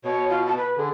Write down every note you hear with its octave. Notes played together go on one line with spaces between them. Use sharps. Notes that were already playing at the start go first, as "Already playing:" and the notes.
B2 C#5
F4
A5
B4
D3 G#4